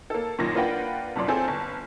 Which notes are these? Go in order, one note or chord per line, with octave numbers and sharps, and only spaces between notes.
A#3 A4
F#2 A#2 D#3 A#6
A#3 D4 F4 B4 F#5 G5
C2 F#2 A#2 D5 C6
C4 F4 G#4 A4 C5 G#5
G1